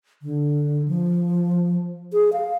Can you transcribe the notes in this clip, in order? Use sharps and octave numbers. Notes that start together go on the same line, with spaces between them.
D3
F3
G#4
F5